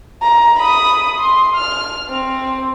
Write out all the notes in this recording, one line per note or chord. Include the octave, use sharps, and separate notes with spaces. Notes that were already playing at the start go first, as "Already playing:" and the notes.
A#5
B5 D#6
C6
F6
C4